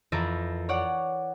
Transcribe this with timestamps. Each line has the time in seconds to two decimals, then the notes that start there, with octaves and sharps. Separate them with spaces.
0.12 F2 E3 A#4 B4 E5 A5
0.69 C#5 D5 F#5